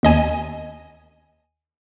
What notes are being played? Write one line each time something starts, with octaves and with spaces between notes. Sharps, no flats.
D#2 D#5 G#5 D#7